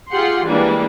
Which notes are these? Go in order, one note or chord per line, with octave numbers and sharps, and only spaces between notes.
F4 G4 G#4 F#5 C6
E3 G3 G#3 A#3 D4